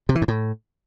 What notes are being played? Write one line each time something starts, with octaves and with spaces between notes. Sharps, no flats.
C3
E3
G#2
A2